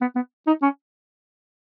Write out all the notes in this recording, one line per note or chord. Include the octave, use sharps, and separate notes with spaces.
B3
B3
D#4
C#4